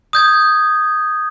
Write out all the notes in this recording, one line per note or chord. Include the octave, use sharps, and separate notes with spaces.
D#6 G6 G#6